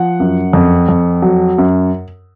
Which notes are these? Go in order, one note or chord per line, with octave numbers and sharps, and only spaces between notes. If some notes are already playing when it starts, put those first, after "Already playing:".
Already playing: F3 F#5
F#2
F2
F2
F#3
F#2